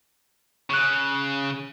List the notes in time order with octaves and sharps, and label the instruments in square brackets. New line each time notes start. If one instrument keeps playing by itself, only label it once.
[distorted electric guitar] C#3 [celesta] C#6 F#6